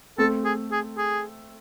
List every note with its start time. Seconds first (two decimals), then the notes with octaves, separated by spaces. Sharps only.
0.18 A3 C4 A4
0.45 G#4
0.72 G#4
0.98 G#4